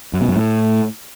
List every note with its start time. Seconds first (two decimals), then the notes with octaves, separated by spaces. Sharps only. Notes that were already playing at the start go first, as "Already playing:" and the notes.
0.13 F#2
0.21 B2
0.28 F#2
0.36 A2